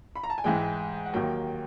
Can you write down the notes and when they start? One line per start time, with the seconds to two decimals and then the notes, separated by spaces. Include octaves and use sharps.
0.16 B5
0.24 A#5
0.30 A5
0.38 G#5
0.44 G#2 E3 G#3 G5
1.06 F#5
1.13 D#2 D#3 F#3 A#3 G5